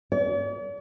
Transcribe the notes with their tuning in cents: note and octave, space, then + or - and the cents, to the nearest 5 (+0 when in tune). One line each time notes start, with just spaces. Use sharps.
D5 -45